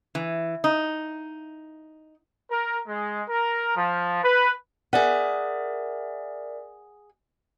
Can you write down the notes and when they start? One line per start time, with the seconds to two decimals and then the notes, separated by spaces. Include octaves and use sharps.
0.15 E3
0.64 D#4
2.50 A#4
2.87 G#3
3.28 A#4
3.76 F3
4.24 B4
4.93 G#4 A#4 D5 E5 F#5